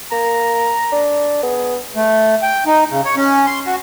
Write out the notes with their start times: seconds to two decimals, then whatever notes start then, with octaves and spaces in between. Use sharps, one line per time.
0.12 A#3 A#5
0.92 D4
1.43 B3 G#4
1.96 A3
2.43 G5
2.66 D#4
2.90 C#3
3.05 C#5
3.17 C#4
3.47 C6
3.66 F#4